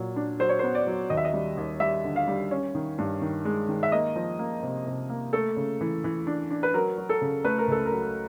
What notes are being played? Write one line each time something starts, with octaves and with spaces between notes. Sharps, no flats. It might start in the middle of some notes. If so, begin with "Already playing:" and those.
Already playing: A#2 F#3
D4
F#3 C5
C#5
C5
B3
D5
F#3
D#2 D#5
E5
D#5
G3
D#2
G3 E5
D3
F5
G3
C#4
D#3
G2
D#3
G#3
D#3
E5
A#3 D#5
F3
A#3
C3
C3
A#3
A3 A4
C#3
E3
E3
D4
D4
B4
F#3 A#4
F#3
A4
C#3
A3 B4
A#4
C#2 A4
A#4
F#3